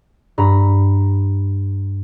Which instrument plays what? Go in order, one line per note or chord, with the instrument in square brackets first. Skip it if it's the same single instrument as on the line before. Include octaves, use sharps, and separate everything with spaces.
[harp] G2 A#5 B5